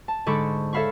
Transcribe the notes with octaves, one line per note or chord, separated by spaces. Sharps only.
A5
G#2 D3 A4 B5 C#6 D6
A4 C#5 E5 F5 B5 C#6